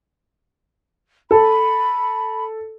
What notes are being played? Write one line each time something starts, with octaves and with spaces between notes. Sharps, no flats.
A4 B5